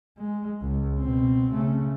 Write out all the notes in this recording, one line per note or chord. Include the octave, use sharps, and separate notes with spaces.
G#3
C#2
B2 C4
C#3 A3